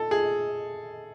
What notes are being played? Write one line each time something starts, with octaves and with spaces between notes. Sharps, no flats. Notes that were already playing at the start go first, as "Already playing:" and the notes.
Already playing: A4
G#4